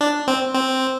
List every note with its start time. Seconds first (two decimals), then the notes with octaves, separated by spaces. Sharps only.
0.01 D4
0.28 C4
0.54 C4